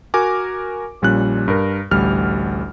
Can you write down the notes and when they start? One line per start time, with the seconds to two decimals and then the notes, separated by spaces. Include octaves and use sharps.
0.14 F#4 A#4 G#5 D6
1.02 A#1 A#2 G3 C#4 F#6
1.48 G2 A#4
1.91 A1 D2 G3 F6